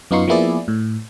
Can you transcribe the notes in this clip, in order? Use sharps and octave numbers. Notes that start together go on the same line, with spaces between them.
F#2 B3 D#4 F4 C6 C#6
F3 A#3 B3 E4 G#4 D5
A2